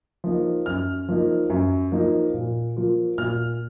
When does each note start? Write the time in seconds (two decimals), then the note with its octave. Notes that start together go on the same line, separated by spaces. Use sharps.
0.24 F3 A#3 D#4
0.66 F#2 F6
1.08 F3 A#3 D#4
1.50 F#2
1.92 F3 A#3 D#4
2.34 A#2
2.76 F3 A#3 F4
3.18 A#2 F6